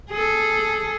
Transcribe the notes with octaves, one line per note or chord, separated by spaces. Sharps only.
G#4 A4